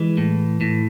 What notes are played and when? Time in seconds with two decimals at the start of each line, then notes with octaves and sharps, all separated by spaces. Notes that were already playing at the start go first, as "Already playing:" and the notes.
Already playing: E3 G#3
0.17 A2
0.61 A2